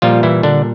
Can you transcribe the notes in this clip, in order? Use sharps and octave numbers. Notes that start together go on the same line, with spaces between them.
A#2 F3 G3 F4
E3 E4
D3 D4